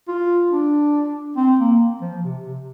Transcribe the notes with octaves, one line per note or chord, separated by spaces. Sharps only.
F4
D4
C4
A#3
F3
C3
C3